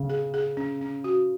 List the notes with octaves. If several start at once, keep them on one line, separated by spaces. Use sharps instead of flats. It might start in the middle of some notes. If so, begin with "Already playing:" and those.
Already playing: C#3
G#4
G#4
C#4
C#4
F#4